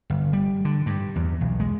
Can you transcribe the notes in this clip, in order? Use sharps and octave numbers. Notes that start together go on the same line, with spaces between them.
G1
G3
D3
G2
E2
B1
G#3